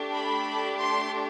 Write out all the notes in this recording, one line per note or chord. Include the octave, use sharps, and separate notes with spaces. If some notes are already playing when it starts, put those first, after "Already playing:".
Already playing: A3 D4 G4
B5
C6